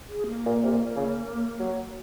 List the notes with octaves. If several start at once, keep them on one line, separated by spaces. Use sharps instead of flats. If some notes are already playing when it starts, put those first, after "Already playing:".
G#4
A#3
A#2
C3
A#2
C#3
F#3